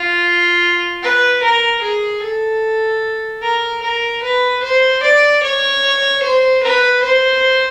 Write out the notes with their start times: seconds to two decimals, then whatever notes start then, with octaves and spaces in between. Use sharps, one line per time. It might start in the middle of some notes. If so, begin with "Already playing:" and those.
Already playing: F4
1.03 B4
1.42 A#4
1.82 G#4
2.23 A4
3.42 A#4
3.82 A#4
4.22 B4
4.63 C5
5.03 D5
5.43 C#5
6.22 C5
6.63 B4
7.03 C5